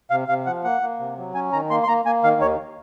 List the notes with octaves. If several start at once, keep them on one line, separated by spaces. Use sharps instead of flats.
C3 F5
C3 F5
F3 F#5
A#3 F#5
A#3
C3
F#3
C#4 G#5
D#3 A#5
A#3 C6
C6
A#3 A#5
A#3 G#5
D#3 F5
D#2 C#5